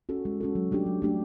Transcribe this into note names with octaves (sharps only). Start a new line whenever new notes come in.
C#4 F#4 A4
G#3
C#4 F#4 A4
F#3
A3 D4 G4
F#3
A3 D4 G4